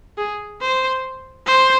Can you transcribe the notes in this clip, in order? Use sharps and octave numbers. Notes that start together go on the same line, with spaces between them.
G#4
C5
C5